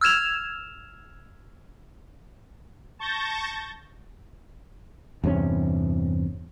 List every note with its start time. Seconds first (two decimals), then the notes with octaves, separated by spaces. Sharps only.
0.01 E6 F6 G#6 E7 F7
2.99 A5 C#6 G6 A6 A#6
5.24 E2 G2 C3 C#4